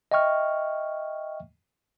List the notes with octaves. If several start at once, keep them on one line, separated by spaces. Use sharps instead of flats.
D#5 E5 G5 C#6 F6